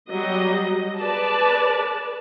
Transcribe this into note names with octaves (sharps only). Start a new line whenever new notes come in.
F#3 G3 D#5
G#4 B4 D5 A5